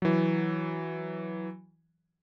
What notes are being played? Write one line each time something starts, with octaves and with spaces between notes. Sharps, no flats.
E3 F#3